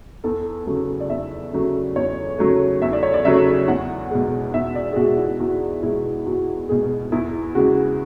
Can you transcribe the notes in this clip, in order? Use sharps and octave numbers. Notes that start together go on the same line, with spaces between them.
E2 A4
C#3 F#3 A3
D5
E2 E5
C#3 F#3 A3
E2 C#5
C#3 F#3 A3
E2 E5
D5
C#5
D5
C#3 F#3 A3 E5
E2 F#5
B2 G#3
E2 E5
D5
G#4
B2 G#3 F#4
E4
E2 F#4
B2 G#3 E4
E2 F#4
B2 G#3 G#4
E2 E4
C#3 G#3 F#4